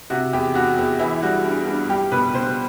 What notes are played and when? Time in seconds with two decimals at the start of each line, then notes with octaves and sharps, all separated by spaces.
0.10 C3 F#4
0.33 E2 G4
0.55 E2 F#4
0.78 E2
0.99 E3 E4
1.22 G3 F#4
1.44 G2
1.67 G2
1.89 G3 G4
2.12 B2 B4
2.34 B2 C5